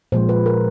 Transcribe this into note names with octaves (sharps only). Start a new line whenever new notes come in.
A#2 F3 G#3 C5
B4
A#4